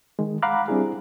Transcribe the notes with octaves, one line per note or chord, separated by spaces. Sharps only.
D#3 G#3
F5 F#5 A#5 B5 D6 F#6
G3 C4 D4 E4 G#4